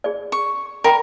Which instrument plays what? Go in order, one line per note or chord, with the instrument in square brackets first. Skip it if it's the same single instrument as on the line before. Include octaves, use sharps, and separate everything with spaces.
[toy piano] G#4 D5
[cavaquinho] C#6
[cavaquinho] A#4 [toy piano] D5 G5 B5